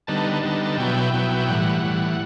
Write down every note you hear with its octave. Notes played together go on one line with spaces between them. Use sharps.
D3 G3 B3 D#4 A5
D3 G3 B3 D#4
B2 F#3 B3 E4 G5
B2 F#3 B3 E4
A2 E3 G3 F#5
A2 E3 G3